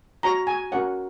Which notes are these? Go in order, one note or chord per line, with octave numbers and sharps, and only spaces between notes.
F#4 C#5 A#5
G#5
C#4 F#4 A#4 C#5 F#5